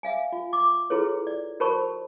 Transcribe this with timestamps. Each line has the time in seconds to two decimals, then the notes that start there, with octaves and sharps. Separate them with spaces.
0.03 E5 F5 G#5
0.32 F4
0.53 D6
0.90 E4 F4 G#4 A4 B4 C#5
1.27 D5
1.60 F#4 A#4 C5 A5 B5 C#6